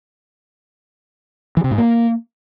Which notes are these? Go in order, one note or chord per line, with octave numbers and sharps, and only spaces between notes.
E3
C3
G#2
A#3